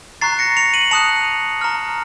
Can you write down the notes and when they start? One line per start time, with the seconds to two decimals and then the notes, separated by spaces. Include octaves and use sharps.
0.21 A#5 C#6 F#6 A6 C7
0.39 A#6 C#7
0.57 C#7 F7
0.74 D#7 F#7
0.91 A5 D#6 F#6 C#7 F7
1.61 A#5 F6